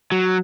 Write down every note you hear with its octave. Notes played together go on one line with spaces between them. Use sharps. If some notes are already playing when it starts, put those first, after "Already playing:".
F#3